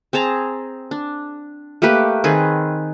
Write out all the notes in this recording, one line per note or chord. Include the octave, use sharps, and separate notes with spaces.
C4 G#4 A5 A#5
D4
A3 A#3 G4 B4
D#3 C4 G#4 B4